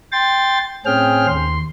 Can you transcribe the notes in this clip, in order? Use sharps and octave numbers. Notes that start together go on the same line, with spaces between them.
G5 C6 A6
A2 C4 C#4 G#4 G5 F6
D#2 C6